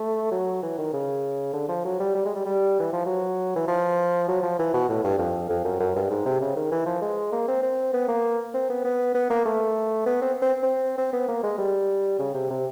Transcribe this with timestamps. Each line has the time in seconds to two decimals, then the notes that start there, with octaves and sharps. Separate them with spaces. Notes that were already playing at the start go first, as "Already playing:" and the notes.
Already playing: A3
0.32 F#3
0.63 E3
0.78 D#3
0.94 C#3
1.53 D3
1.69 F3
1.85 F#3
2.00 G3
2.15 G3
2.26 G#3
2.35 G3
2.46 G3
2.80 E3
2.93 F3
3.06 F#3
3.56 E3
3.68 F3
4.28 F#3
4.43 F3
4.59 E3
4.74 B2
4.89 A2
5.04 G2
5.19 F2
5.50 F2
5.65 F#2
5.80 F#2
5.96 G2
6.10 G#2
6.26 C3
6.41 C#3
6.56 D#3
6.72 E3
6.86 F3
7.02 G#3
7.32 A#3
7.48 C4
7.63 C4
7.93 B3
8.09 A#3
8.54 C4
8.70 B3
8.84 B3
9.15 B3
9.30 A#3
9.45 A3
10.06 B3
10.22 C4
10.42 C4
10.63 C4
10.98 C4
11.13 B3
11.28 A#3
11.44 G#3
11.58 G3
12.19 C#3
12.34 C3
12.50 C3